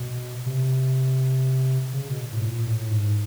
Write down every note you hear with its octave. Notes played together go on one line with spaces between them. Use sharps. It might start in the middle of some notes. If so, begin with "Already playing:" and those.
Already playing: B2
C3
C#3
B2
A2
A#2
A2
G#2